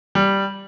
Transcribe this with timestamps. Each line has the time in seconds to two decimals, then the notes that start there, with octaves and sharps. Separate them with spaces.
0.15 G3